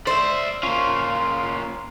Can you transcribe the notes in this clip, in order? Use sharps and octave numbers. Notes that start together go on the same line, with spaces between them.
C5 D5 E5
A#3 C#4 F4